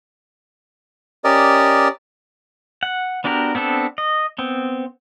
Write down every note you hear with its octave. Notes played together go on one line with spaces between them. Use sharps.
C#4 G4 A#4 D5 D#5
F#5
B3 D4 F#4 G4 A#4
B3 C4 D4 A4
D#5
B3 C4